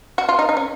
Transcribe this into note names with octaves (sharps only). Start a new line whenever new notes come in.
F#4
F4
D#4
D#4
C#4